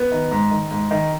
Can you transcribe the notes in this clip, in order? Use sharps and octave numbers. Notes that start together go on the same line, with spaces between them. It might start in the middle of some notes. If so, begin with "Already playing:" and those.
Already playing: B3
D#3
G#2
D#3
G#2
D#3